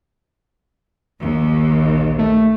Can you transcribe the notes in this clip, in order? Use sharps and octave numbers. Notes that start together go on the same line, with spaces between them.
A#1 D#2
A3